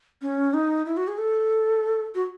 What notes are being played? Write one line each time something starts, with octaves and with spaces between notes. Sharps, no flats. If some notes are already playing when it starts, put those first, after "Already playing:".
C#4
D#4
E4
F#4
G#4
A4
F#4